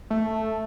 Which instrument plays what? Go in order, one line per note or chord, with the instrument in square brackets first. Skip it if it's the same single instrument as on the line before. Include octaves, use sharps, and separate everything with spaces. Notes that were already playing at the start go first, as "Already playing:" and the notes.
[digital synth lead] A3